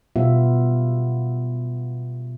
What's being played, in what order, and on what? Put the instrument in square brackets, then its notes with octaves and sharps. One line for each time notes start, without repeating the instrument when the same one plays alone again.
[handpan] B2 G3 B3 F4 E5